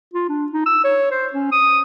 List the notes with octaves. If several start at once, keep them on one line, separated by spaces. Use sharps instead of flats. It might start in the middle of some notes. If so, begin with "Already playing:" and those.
F4
D4
D#4
E6
C#5
C5
C#4
D#6